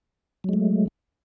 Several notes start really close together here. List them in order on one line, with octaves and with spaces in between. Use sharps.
F#3 G#3 A3